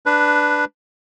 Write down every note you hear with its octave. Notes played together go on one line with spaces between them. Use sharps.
D4 B4